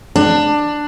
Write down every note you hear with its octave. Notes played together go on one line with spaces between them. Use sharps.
D4